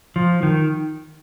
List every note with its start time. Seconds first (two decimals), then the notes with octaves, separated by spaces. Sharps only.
0.16 F3
0.43 D#3